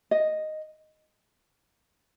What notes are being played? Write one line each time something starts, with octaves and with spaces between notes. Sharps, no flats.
D#5